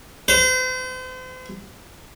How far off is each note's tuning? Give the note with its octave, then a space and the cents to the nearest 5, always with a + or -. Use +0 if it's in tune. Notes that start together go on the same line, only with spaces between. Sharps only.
C5 -40